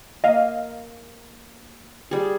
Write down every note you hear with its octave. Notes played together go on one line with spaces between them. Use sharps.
A#3 D#5 F5
G3 G#4